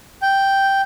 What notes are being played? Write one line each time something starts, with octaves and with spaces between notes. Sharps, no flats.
G5